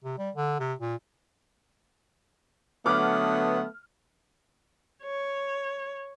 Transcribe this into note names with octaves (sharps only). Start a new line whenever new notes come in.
C3
G3
D3
C3
A#2
D3 F#3 A3 B3 D6 F6
C#5